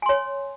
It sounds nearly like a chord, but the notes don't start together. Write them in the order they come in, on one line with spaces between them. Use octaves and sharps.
G#5 C6 C#5